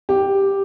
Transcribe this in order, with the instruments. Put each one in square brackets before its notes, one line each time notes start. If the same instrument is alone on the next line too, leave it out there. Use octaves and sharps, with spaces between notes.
[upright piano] G4